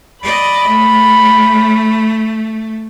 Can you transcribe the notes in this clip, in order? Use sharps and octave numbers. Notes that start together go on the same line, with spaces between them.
D5 D#5 B5
A3